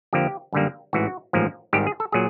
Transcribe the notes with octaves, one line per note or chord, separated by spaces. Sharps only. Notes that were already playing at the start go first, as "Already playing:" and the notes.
F2 D3 F3 A#3 G4
F#2 D3 G3 A#3
A1 G#2 E3 F#4
A1 G#2 F3 A#3
G#1 G#2 D#3 G3 G4
G#4
A4
A#2 F#3 G#4